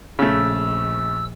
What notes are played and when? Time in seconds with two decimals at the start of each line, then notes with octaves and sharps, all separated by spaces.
0.19 A#1 C#3 A3 E6